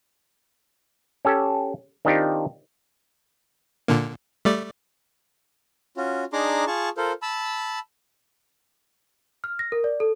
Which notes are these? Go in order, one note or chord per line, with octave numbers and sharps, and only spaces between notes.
C#4 G4 A4
D#3 C4 D4 D#4 F4 G4
A#2 D3 A#3
G3 A3 D5
C#4 F4 F#4
D4 D#4 G#4 A#5 C6 D6
F4 G#4 A5 C#6
F4 A4 A#4 C5
A5 B5 E6
F6
A#6
A#4
D5
A4